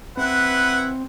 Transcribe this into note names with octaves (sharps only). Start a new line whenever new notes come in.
C4 E4 B4 F#5